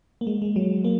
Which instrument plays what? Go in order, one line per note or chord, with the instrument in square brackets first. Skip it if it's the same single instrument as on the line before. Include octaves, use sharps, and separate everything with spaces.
[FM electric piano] A#3
G#3
G#3
F#3
A#3